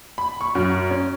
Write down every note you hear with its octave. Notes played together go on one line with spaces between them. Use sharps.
B5
C#6
F#2
C#4